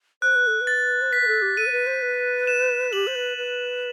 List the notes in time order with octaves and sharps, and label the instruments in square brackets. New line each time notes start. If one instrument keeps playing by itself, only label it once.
[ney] C5 [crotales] F#6
[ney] B4
A4
B4
[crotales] A6
[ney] C5
[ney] B4 [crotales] B6
[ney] B4
A4
G4
[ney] A4 [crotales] D#7
[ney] C5
B4
C5
B4
[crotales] E7
[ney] G4 [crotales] F#7
[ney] C5
B4
B4